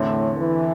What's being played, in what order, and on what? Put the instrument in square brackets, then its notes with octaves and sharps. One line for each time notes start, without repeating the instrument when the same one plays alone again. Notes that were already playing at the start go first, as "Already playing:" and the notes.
Already playing: [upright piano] E2 D3 A3 C4 [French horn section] A2
[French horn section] E3